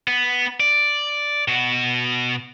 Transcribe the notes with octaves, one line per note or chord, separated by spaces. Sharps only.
B3
D5
B2 F#4